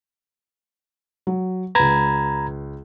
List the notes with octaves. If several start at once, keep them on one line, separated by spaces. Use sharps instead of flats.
F#3
C#2 B4 A#5 B5 G#6